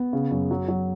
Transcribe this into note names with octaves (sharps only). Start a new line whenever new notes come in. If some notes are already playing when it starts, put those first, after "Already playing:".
Already playing: B3
C#3
F#2
F#3
F#3